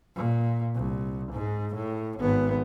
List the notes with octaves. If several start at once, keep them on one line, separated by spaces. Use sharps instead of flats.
A#2
C2
G#2
A2
G#1 B3